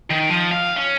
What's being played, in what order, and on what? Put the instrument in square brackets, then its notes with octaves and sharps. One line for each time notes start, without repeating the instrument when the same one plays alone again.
[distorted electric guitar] D#3
F3
F5
C#4